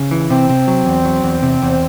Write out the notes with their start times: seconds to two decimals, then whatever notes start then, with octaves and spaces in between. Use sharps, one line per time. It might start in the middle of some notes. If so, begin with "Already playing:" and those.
Already playing: C#3
0.11 E3
0.30 C3 C4
0.49 C3
0.68 F#3
0.86 E2
1.05 F#3
1.23 E2
1.42 C3
1.62 E2